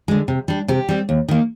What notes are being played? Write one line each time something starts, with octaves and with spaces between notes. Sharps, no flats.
D3 G#3
C3
G3 D4
C3 G4
G3 C4
D#2
D#3 A#3